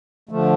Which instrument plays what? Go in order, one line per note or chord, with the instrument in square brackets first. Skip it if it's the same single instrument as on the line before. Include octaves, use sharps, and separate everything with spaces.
[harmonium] D3 F3 A3